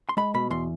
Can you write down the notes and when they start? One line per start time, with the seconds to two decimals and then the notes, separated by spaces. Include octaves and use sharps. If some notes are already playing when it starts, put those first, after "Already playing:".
0.09 C6
0.17 G#3 B5
0.34 B2 B5
0.50 E2 C6